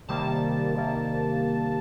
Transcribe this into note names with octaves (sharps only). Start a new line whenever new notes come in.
C3 D#3 G3 A#3 A5
C3 D#3 G3 A#3